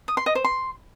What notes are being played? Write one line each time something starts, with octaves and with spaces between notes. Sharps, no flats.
D#6
C6
D#5
C5
C6